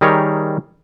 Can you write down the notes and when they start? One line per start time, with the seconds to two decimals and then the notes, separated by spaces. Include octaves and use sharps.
0.01 D#3 G3 G#4 A#4 C#5